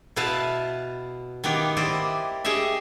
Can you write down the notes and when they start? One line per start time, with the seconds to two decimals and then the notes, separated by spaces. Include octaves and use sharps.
0.16 B2 B3 E4 B4 F5 A5
1.44 D#3 A#3 B3 G4
1.77 E4 G4 C5 D5 D#5
2.45 G4 G#4 C#5 D#5 E5